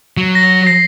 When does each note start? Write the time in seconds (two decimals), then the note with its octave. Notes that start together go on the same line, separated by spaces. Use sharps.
0.17 F#3
0.35 A#6
0.66 A#6 C7